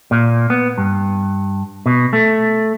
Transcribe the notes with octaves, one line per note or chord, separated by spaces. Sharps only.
A#2
B3
G2
B2
A3